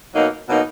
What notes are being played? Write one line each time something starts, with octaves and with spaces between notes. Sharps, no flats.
B2 F#3 A#3 D#4
B2 F#3 A#3 D#4